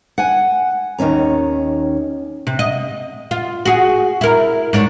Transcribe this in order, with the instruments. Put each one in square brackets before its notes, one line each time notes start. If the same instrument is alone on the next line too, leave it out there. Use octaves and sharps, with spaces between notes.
[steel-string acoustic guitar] F#5 G#5
D#2 D#3 C#4 A#5
[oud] C3
D#5
F4
F#4 G#4
E4 A#4
G#2 D4 C#5